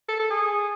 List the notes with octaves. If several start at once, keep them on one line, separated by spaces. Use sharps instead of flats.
A4
A4
G#4